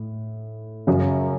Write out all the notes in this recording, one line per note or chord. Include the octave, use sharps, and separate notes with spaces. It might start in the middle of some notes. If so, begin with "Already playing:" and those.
Already playing: A2
F#2 C#3 F#3